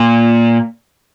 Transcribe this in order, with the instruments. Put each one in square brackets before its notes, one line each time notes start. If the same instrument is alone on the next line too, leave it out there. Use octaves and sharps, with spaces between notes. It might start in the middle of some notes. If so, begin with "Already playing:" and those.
Already playing: [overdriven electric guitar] A#2